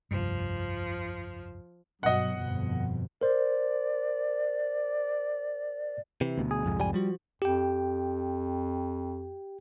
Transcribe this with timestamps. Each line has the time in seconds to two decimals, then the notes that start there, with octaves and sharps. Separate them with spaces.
0.11 F1 C2 G2 F3
2.03 G2 B2 F#3 D#5 F#5
2.40 G1 F2 B2
3.21 A#4 C5 D5
6.21 C3 E3
6.38 D2 B2
6.51 G#4
6.64 C2 F2 G#2
6.80 G3 G#5
6.94 F3 G3 F#4
7.42 F2 G4 G5